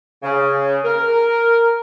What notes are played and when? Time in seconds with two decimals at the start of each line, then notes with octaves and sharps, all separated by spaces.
0.23 C#3
0.85 A#4